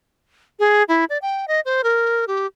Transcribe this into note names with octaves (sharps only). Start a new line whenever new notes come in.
G#4
E4
D5
G5
D#5
C5
A#4
G4